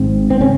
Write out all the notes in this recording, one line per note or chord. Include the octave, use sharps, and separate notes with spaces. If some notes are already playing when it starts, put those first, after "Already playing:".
Already playing: G#1 G#2 C4
C4
C#3 C#4